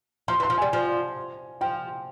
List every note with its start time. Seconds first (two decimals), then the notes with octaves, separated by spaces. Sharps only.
0.28 F3 C6
0.40 E3
0.43 C6
0.50 F3
0.58 G3 G#5
0.73 F3
1.61 F3 G5